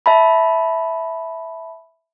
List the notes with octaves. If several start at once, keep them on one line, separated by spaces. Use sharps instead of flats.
E5 A5 B5